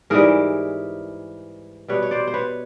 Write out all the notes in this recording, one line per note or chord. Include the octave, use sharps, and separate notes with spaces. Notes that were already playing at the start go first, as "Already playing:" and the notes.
G#2 E3 G3 G#4 A#4
B2 G3 B4 C#5
C#5
C5 D5
C5
B4 C#5